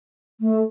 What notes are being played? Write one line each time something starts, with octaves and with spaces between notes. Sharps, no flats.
A3